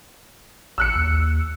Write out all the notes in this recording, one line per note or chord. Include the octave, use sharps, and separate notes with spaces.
A1 E6 F#6 C#7
D#2